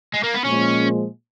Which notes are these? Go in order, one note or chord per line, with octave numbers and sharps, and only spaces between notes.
G#3
A#3
B3
A#2 F3 G#3 C#4